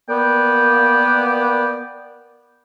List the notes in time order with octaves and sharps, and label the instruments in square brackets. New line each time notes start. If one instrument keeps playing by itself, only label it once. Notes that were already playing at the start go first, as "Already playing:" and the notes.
[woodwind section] A#3 B3 D5 G5